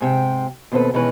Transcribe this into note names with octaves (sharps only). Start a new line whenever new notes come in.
G#2 C3 G5
D#2 B2 C4 F#4 A4 B4
B2 D#3 E3 G#3 C#4 B4